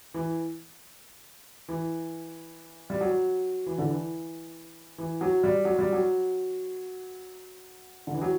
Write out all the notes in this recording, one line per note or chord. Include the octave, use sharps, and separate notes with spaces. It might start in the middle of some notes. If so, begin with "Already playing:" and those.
E3
E3
G3
F#3
E3
D3
E3
E3
F#3
G3
F#3
G3
F#3
D3
E3
F#3